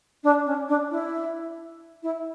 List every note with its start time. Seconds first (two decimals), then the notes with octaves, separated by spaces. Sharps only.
0.23 D4
0.46 C#4
0.68 D4
0.90 E4
2.02 E4